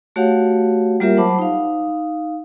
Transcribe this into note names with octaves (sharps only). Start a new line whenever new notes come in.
A3 F#4 G4 C#5 F5 F#5
G3 A#3 F4 G4 A#4 E5
F#3 C5 F#5 A5 B5 D6
D#4 F5